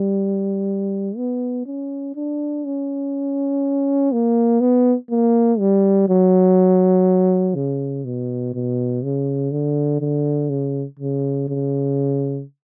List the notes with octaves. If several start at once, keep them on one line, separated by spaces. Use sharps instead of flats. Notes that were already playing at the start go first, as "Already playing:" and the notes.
Already playing: G3
B3
C#4
D4
C#4
A#3
B3
A#3
G3
F#3
C#3
B2
B2
C#3
D3
D3
C#3
C#3
C#3